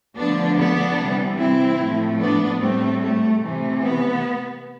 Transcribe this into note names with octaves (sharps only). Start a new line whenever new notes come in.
D3 F3 A3 B3 D4
B3 D4
C3 E3 G3
C4 E4
A2 F3 A3
B3 D4
A2 G3 A3 C4
A3
C3 E3 A3
B3